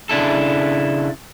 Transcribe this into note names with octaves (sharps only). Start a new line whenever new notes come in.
C#3 D4 E4 A4